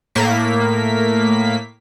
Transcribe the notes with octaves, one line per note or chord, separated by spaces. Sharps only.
A2 A#3 B6